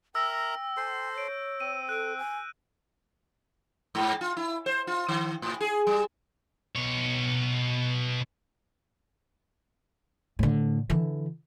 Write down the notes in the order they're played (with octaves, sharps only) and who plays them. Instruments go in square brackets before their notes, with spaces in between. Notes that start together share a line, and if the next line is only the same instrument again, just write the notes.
[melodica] A#4 E5 A#5 [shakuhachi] G5 [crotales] E6 A#6
[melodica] A4 C5 C6
[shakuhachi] C#5 [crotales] G6 D7
[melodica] C4 [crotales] D#7
[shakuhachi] A4 [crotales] F#6 D7
[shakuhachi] G#5
[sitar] G#2
F4
E4
C5
F4
D#3
A2
G#4
G3
[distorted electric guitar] B2 C#5
[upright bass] A2 D3
D3 E3